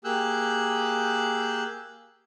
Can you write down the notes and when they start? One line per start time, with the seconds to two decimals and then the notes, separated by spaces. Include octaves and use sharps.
0.05 A#3 G4 G#4 E6 F#6 G6